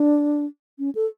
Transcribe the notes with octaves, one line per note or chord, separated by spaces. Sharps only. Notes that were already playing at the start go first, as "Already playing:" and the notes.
Already playing: D4
C#4
A4